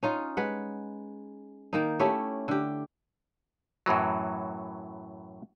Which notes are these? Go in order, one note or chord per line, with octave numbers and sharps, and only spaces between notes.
C#4 D#4 F4
G#3 B4 F#5
D#3 A#3 D#4
A3 C#4 E4 G4
D3 G4
F#2 A2 E3 F#3